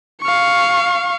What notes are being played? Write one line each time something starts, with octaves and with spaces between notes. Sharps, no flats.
F5 C#6